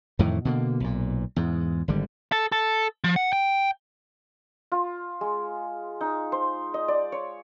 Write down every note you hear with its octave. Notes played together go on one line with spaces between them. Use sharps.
F2 A2 D#3 E3
B2 D3 A#3
B1 A#2
E2 G#2
G#1 D3 G3
A4
A4
F3
F#5
G5
F4
G#3
D#4
C5
D#5
D5
C#5